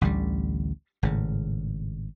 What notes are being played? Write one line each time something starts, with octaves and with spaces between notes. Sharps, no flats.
A1 D2 D3 G3
G#1 A2 C#3